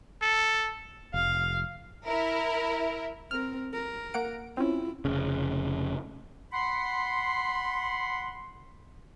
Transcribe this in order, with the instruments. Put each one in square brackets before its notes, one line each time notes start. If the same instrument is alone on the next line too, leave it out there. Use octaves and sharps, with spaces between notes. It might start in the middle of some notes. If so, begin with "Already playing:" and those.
[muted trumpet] A4
[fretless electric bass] F1 [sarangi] F5
[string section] E4 A#4
[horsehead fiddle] C4 A#4 [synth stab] F6
[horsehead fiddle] A#4
[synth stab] A#3 F#5 D7
[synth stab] C4 C#4 [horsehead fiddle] E4 F4
[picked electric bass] F1 C#3
[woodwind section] F#5 B5 C6